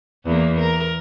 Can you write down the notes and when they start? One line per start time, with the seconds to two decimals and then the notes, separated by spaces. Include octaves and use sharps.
0.25 E2 A#3
0.60 A#4